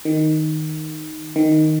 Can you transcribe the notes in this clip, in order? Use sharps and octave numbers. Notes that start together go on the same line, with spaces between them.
D#3
D#3